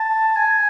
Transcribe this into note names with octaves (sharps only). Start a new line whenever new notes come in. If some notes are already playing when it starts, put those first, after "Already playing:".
Already playing: A5
G#5